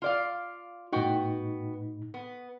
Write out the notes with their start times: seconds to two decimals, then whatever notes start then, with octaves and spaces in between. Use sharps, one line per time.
0.02 F4 D5 F5
0.93 A2 B3 D#4 F#4 G5
2.14 B3